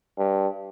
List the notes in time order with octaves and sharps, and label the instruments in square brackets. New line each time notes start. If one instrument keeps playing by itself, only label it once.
[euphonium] G2